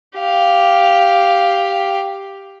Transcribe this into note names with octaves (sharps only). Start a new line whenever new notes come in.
G4 F5